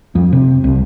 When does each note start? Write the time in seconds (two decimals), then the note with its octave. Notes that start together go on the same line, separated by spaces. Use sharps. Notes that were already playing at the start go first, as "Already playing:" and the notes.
0.15 F2
0.33 C3
0.64 C2